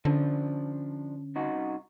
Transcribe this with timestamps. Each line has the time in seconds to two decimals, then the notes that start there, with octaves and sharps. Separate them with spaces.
0.05 D3 F3 C#4 D4
1.35 C2 D#4 F#4